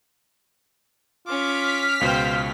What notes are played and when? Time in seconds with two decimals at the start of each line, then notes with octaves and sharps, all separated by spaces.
1.27 C#4 F4 D6 F6 B6
2.01 C#2 B2 C5 F5 G5